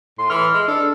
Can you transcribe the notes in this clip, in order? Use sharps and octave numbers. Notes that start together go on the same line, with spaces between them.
A2 C6
E3 F6
G#3
D4 A4